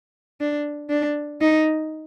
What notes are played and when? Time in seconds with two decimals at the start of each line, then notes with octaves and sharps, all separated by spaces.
0.41 D4
0.90 D4
1.42 D#4